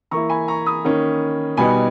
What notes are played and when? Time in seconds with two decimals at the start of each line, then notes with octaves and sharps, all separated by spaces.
0.11 E3 A#3 E4 A#5 C#6
0.29 G#5 B5
0.48 A#5 C#6
0.66 B5 D#6
0.85 D#3 A#3 C#4
1.57 B2 G3 B3 D#4 G#5 B5